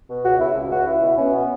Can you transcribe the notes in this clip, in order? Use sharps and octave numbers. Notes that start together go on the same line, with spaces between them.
B2
C#2 F#4
C#2 E4
C#2
C#2 F#4
C#2 E4
B2
B2 C#4
B3